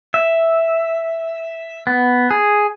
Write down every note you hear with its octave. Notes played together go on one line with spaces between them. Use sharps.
E5
B3
G#4